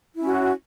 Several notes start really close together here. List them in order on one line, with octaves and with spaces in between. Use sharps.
E4 C#4 F#4